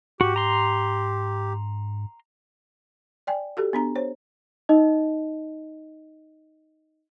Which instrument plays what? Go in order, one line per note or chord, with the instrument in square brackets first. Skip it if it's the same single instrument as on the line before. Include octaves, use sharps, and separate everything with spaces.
[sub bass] G#2 [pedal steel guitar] F#4 [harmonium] G4
[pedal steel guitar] A#5 C6
[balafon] D5 G5 G#5
F#4 G4 A4
B3 D4 A#5
C5 C#5
[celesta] D#4 D#5